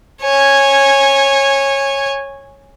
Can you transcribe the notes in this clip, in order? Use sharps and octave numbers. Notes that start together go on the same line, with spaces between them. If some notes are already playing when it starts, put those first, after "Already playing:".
C#5 G#5